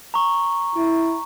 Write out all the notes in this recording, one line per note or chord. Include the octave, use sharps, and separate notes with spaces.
A#5 C#6
E4